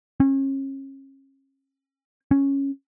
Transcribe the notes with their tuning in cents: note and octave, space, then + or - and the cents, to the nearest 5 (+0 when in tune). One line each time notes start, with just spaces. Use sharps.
C#4 -35
C#4 -5